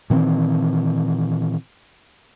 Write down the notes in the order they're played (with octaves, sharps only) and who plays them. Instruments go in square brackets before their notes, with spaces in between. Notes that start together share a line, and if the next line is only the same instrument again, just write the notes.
[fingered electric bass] A#2 D#3 E3 C4